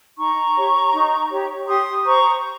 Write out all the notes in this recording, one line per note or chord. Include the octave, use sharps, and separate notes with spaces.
D#4 A#5 C#6
G4 C#5
D#4
G4 C#5
G4 C6 D#6
C5 A#5 C#6